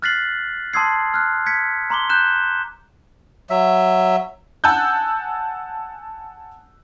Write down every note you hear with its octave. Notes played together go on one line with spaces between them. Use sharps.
F6 F#6 A6 B6 C7 F#7
A5 C6 D#6 E6 G#6 C7
F6 F#6
G#6 B6 C#7
A#5 C6 D6 G7
A#5 F#6 G6 E7
F#3 E5
F#5 G#5 A5 E6 F#6 G6